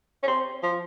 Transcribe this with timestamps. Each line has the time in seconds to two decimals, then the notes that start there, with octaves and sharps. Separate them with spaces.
0.23 C#4
0.28 C4
0.63 F3